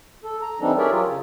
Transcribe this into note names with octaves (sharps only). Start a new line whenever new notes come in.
A4
A#5
E3 G3 C4 D4 D#4 A4
G4 G#4 A#4 C#5 D5 E5
F#3 F4
C#3